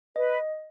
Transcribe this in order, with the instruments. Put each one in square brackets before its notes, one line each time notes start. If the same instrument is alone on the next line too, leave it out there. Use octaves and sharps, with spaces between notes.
[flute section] B4 [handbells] D#5